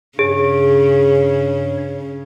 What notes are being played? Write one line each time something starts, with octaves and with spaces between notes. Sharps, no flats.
G2 C#3 G#4 C#5